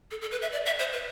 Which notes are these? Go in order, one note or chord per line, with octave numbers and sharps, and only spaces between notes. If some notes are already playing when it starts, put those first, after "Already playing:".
A4
A4
B4
E5
D5
E5
C5
B4